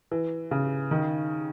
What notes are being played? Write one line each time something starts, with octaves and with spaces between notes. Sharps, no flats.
E3
C#3
D#3